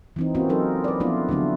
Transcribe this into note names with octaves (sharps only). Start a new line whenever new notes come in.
E3 C4 D#4
A#3 C4 C#4 F4 F#4
F#3 D#4 A4 A#4
B4 D5
F3 A3 B3 D4 E4 F4
D3 F#3 A3 B3